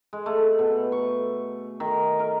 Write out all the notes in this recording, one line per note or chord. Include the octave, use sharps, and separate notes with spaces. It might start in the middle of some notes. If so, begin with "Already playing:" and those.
G#3
A3
B2
C#6
D#3
A#4